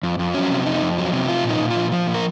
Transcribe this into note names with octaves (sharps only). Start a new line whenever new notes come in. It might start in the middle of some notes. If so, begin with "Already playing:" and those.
F2
F2
F#3 C#4
C3
F2 D#4
F2
F#3
C3
F3 F4
A#2
D#4
A#2
F4
F3
F3
A#2
A#4